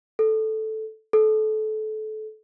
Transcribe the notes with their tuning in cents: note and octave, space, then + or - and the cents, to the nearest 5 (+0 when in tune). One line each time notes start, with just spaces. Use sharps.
A4 -5
A4 -25